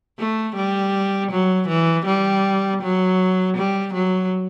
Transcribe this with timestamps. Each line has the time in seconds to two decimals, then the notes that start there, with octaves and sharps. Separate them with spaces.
0.19 A3
0.55 G3
1.31 F#3
1.68 E3
2.06 G3
2.82 F#3
3.57 G3
3.93 F#3